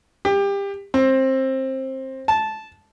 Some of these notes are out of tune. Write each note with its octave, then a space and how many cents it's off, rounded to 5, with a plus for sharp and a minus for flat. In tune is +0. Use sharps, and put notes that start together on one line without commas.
G4 +25
C4 +20
A5 -10